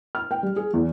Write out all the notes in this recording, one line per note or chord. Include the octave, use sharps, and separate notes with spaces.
F6
G5
G3
G#4
E2